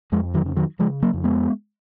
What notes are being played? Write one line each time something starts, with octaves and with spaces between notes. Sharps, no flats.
F2 F3 G#3
D#3 F#3
C#3
D#3 F#3
C#3 F3 G#3
F#3 A#3
F2
G#3 B3